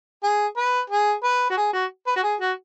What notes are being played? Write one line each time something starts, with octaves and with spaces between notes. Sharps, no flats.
G#4
B4
G#4
B4
F#4
G#4
F#4
B4
F#4
G#4
F#4